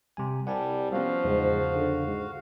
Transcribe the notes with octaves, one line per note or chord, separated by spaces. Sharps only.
C3 G3 G#5
C2 G3 F#5 G#5 A5
F3 G3 B3 C#4 F#4 F5
E2 G#2 C#3
D3
G#2